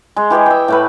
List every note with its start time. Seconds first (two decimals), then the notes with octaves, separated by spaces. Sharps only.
0.16 G#3
0.30 E3 G4 G#4 D#5
0.46 E5 G5
0.68 A2 A3 B4